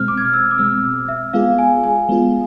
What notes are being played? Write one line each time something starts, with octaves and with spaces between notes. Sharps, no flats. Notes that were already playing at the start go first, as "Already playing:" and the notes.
Already playing: B2 G#3 C4 F6
D6
G#6
F6
E6
D6
B2 G#3 C4 E6
E5
G#3 B3 F4 G#4 F5
G#5
G#5
G#3 B3 F4 G#4